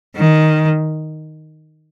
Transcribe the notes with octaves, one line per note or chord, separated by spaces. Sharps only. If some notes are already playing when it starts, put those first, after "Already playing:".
D#3